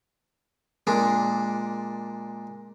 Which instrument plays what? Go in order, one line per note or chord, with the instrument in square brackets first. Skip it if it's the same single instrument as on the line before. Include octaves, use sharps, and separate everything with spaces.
[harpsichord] A#2 G#3 D4